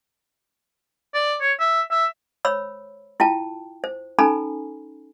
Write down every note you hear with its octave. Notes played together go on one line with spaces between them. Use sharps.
D5
C#5
E5
E5
C5 C#5 B5 E6
E4 F4 G5 A5 A#5
C5
C#4 D#4 A4 G#5 A#5 B5